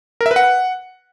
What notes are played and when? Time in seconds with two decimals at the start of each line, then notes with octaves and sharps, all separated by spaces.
0.21 A#4
0.26 E5
0.31 B4
0.36 F#5